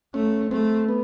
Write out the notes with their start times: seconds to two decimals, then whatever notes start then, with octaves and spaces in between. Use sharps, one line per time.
0.14 A3 C#4
0.51 A3 C4
0.88 B3